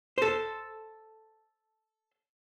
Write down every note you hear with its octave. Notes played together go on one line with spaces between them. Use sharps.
A4 C5